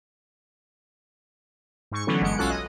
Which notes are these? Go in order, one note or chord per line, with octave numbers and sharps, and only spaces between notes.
G#2 C#6
D3 E3 F#3 A3 B3 C#4
G1 G#3 B3 C#7 D7
B1 C#4 F4 F#4 A4 F#6
D#5